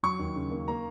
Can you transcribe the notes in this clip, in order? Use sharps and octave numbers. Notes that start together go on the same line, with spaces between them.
F#3 C#6
D#2
C#3
A#3
A#3 A#5